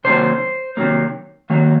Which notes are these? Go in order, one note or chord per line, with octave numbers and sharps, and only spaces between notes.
C3 D#3 F#3 A#3 C5
C3 D#3 F#3 A#3
D#3 F#3 A#3